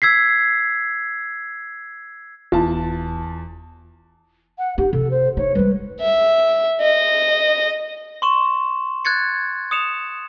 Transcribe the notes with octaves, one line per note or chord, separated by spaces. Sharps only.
E6 G#6 B6 C7
F1 E2 F4 A5
F#5
C4 D#4 G4
C3 A4
C5
D#4 C#5
G3 G#3 B4
E5
D#5
C6 C#6 E7
F#6 G#6 A6 C#7
D#6 C#7 E7 F7